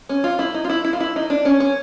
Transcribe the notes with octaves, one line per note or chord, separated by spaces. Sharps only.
C#4
F4
E4
D#4
F4
E4
E4
F4
E4
D#4
D4
C#4
C#4